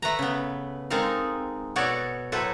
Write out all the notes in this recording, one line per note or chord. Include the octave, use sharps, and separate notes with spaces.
A3 B4 A#5
C#3 B3
G#3 C4 D#4 A4 A#4 F5
B2 B3 F#4 A4 C#5 D5
A2 F#3 A4 B4 C5